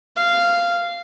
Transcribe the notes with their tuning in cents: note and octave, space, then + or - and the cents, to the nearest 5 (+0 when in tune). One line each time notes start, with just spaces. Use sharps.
F5 -10